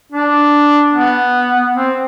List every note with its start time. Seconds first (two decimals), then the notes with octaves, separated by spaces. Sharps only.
0.12 D4
0.94 B3
1.75 C4